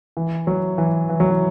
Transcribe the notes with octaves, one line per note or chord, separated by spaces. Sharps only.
E3
F#3
E3
E3
F#3
E3